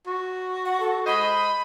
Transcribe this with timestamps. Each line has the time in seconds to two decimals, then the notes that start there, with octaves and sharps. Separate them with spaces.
0.07 F#4
0.65 F#5
0.80 A4
1.07 G#3 C5 D#5 B5